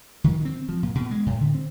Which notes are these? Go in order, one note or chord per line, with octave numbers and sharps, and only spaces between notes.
D#3
C4
F3
A#2
B2
G#3
A2
D3
C4